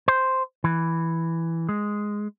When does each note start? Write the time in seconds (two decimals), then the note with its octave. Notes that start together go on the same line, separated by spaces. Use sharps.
0.08 C5
0.64 E3
1.69 G#3